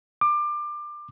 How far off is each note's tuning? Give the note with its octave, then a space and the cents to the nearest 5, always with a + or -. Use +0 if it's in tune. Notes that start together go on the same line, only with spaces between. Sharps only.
D6 +25